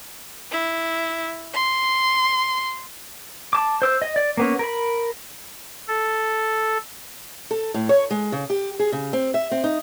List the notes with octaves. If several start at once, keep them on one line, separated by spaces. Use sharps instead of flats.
E4
C6
A5 D6
C5 E6
D#5
D5
A#3 B3 C#4
A#4 B5
A4
A4
A2
C#5
G#3
C#3
G4
G#4
C#3
C4
E5
C4
D#4